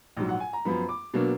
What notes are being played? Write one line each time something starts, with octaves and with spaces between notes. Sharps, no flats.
A#1 G#2 F#3
F#5
G#5
A#5
F#2 F3 B3 B5
D6
B2 F#3 A#3 D4